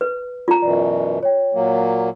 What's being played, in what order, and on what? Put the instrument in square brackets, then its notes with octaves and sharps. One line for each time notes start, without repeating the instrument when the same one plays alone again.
[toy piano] B4
F4 A#5
[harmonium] F#2 B2 E3 [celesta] D5
[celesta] C#5 G5
[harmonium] A#2 F#3 A#3